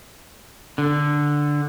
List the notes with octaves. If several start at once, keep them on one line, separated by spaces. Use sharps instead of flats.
D3